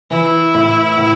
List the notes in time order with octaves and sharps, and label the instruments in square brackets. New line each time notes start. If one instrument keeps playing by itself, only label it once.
[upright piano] E3 [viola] E4
[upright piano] A2
A2